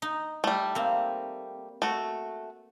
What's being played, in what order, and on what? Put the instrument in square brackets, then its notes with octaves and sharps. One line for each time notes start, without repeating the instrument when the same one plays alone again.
[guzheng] D#4
[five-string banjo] G3 A3
[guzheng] A#3 C4
[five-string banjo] A3 F#4